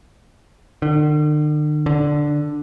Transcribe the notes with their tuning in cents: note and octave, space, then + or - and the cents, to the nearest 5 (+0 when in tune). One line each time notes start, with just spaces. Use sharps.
D3 +45
D3 +5